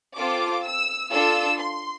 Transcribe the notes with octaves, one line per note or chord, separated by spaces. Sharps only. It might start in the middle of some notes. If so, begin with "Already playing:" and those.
C4 F4 A4 D6
E6
D4 F4 A4 E6
C6